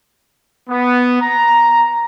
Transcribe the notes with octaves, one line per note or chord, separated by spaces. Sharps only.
B3
A#5